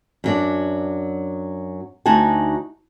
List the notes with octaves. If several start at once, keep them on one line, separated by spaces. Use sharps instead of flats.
F#2 F#3 D4
D2 D#4 F#4 G#5 A5